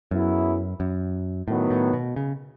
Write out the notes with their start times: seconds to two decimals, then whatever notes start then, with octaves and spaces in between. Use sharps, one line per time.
0.11 F#2 F#3 B3 E4 G#4
0.80 F#2
1.48 A2 D#3 F#3 B3
1.70 A2
1.93 B2
2.16 C#3